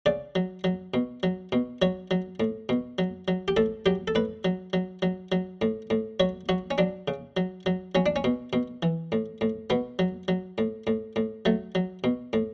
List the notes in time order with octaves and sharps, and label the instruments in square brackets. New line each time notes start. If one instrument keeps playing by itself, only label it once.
[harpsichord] C#3 D5
F#3
F#3
B2
F#3
B2
F#3 C#5
F#3
A2
B2
F#3
F#3
G4
A2 A4
F#3 G4
A4
A2 B4
F#3
F#3
F#3
F#3
A2
A2
F#3 C#5
F#3 F#4
C#4
F#3 D4
C#3
F#3
F#3
F#3 C#4
D4
C#4
B2
B2
E3
A2
A2
B2 B3
F#3
F#3
A2
A2
A2
F#3 A3
F#3
B2
A2